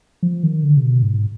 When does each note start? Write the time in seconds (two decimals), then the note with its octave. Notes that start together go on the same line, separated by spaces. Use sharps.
0.23 F3
0.43 D#3
0.63 D3
0.77 C3
0.83 B2
1.02 G#2